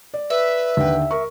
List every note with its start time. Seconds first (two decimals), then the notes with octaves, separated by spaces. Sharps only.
0.14 D5
0.30 B4 E5
0.77 D#2 D3 G5
1.11 A#4 C#6